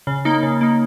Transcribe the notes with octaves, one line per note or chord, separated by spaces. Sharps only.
C#3
A#3 D#4
C#3
A#3 D#4